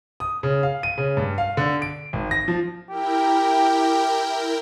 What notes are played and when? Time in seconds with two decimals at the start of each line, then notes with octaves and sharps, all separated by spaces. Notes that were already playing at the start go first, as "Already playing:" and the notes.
0.20 D#6
0.43 C#3
0.63 F5
0.83 D#7
0.98 C#3
1.17 G2
1.38 F5
1.57 D3
1.82 D7
2.13 G#1
2.31 A#6
2.48 F3
2.90 E4 G4 A#4 G5